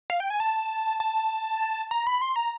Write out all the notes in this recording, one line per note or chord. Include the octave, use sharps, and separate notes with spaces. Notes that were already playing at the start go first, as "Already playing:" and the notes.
F5
G5
G#5
A5
A5
A#5
B5
C6
A#5